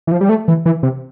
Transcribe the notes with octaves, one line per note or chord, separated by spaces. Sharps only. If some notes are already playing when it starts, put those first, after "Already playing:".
E3
F3
G3
A3
E3
E3
C3